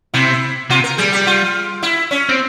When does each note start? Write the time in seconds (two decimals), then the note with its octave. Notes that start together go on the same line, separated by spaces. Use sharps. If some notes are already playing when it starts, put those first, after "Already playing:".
0.14 C3 E4
0.70 C3 F4
0.84 A#4
0.98 G3 G#4
1.12 G4
1.27 F4
1.83 E4
2.11 C#4
2.29 C4